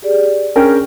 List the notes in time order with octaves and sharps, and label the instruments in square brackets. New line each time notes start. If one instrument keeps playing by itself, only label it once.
[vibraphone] G4 G#4 D5
[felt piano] C#4 A#4 G5 [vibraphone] D4 G#4